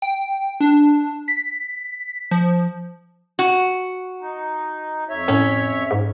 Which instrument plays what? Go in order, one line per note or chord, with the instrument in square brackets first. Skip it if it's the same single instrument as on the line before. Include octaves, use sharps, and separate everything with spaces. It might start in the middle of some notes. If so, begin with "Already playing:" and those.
[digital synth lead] G5
D4
B6
F3
[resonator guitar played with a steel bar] F#4
[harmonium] D#4
F2 C#5 E5
[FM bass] A2 [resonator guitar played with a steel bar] C#4
[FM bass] G#2